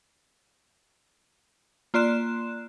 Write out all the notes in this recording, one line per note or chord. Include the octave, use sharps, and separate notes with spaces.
A#3 F4 D5 C6 F#6 E7